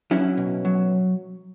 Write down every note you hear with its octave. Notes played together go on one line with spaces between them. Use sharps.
F#3 C#4 E4
B2
F#3